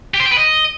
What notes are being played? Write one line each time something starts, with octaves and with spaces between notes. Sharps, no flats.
G4
C5
G5
B4
D#5